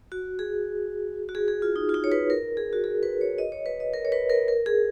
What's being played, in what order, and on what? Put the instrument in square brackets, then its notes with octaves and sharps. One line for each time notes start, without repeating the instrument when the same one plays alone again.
[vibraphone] F#4
G#4
F#4
G#4
G#4
F4
D#4
F4
D#4
C#5
B4
A#4
G#4
F#4
G#4
B4
C#5
D#5
C#5
B4
D#5
A#4
C#5
B4
A#4
A#4
G#4